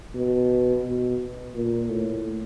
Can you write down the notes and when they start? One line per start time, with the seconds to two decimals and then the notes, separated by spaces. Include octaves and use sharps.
0.14 B2
0.84 B2
1.55 A#2
1.89 A2